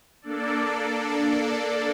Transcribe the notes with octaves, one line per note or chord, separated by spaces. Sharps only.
A#3 D4 A4 D5